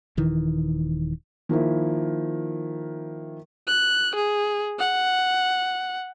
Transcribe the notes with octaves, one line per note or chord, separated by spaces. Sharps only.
D#1 D#3 E3
D#3 F3 A#3 E4
F#6
G#4
F#5